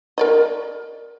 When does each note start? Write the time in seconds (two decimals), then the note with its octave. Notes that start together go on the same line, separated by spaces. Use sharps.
0.18 A#4 D5 D#5